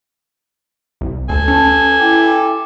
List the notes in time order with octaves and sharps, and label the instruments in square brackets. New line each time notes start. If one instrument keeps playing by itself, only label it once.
[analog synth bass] C2
[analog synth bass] D2 [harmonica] A4 G#5
[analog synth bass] C#4 [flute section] A5
[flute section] E4 G5 D6